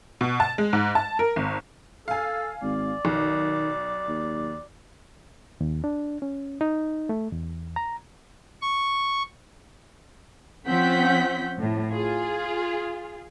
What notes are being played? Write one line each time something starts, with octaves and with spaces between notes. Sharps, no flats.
B2
A5
G#3
G#2
A5
A#4
G#1
A4 F5 G#5
G#1 D5
B1 D#3
D#2
D#2
D4
C#4
D#4
A3
E2
A#5
C#6
F3 C4 C#4 F#5 G6 B6
A2
F4 G#4